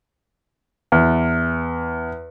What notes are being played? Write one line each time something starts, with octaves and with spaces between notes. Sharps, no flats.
E2